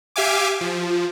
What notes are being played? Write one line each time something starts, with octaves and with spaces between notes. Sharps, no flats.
G4 E5 F5 G#5 D6
F3